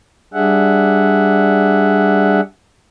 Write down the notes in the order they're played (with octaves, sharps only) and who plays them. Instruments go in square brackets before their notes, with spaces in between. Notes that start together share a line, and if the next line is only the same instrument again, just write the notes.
[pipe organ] G3 D4 G#4 E5 F#5